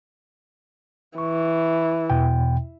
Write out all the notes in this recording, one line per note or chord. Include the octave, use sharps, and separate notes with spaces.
E3 C#6
E2 B2 G5